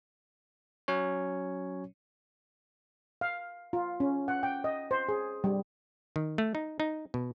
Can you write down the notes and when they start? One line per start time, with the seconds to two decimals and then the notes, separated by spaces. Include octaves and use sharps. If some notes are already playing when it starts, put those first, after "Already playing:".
0.88 F#3 C#4 C#5
3.21 F5
3.73 F4
4.00 C#4
4.28 F#5
4.43 G5
4.64 D#5
4.91 C5
5.09 G#4
5.44 G3
6.16 D#3
6.38 A3
6.55 D#4
6.80 D#4
7.14 B2